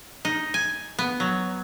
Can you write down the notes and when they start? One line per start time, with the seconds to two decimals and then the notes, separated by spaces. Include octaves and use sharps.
0.25 D#4
0.54 G#5
0.99 B3
1.20 F#3